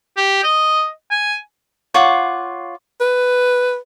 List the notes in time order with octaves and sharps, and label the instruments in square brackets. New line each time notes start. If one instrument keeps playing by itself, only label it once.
[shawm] G4
D#5
G#5
[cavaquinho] F4 C#5 F#5 D6
[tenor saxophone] B4